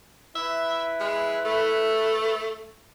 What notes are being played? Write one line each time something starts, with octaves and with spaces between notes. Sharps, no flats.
E4 B4 E5
G#3
A3